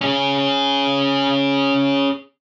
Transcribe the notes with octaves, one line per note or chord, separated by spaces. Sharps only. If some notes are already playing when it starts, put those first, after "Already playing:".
C#4 G#4